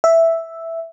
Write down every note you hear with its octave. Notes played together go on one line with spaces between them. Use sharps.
E5